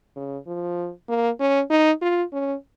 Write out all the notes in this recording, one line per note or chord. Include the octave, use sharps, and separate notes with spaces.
C#3
F3
A#3
C#4
D#4
F4
C#4